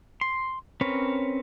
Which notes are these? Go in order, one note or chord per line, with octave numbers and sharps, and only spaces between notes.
C6
C4 C#4 A#4 B4 C#5